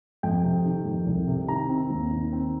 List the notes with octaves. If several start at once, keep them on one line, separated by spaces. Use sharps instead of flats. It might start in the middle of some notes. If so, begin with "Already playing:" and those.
F2 G5
C3
D#3
F2
C2
C3
D#3 A#5
C4
D#2
D#3
C4